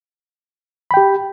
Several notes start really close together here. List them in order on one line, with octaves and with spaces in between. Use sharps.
B5 G5 G4